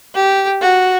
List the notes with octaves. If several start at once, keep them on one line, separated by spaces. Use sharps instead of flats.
G4
F#4